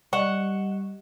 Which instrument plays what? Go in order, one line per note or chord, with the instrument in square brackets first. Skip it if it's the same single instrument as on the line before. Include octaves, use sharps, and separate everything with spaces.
[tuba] G3 [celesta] D#5 E7 G7 [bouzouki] F#5 [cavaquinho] C#6